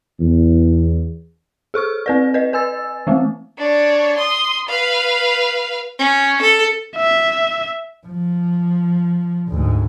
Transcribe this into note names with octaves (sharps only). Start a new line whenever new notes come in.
E2
G#4 A4 C#6 F6
C4 B4 D5
B4 D#5
B4 G#5 E6 A6
E3 G#3 A3 C4
D4 C#5
C6 D#6
B4 F5
C#4
A4
E5
F3
D2 G#2